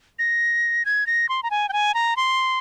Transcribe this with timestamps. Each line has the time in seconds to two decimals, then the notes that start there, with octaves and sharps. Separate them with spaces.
0.19 A#6
0.85 G#6
1.07 A#6
1.29 C6
1.43 A#5
1.51 G#5
1.69 G5
1.73 G#5
1.94 A#5
2.17 C6